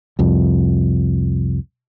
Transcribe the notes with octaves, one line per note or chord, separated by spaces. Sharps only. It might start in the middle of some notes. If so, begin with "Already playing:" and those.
C2 F2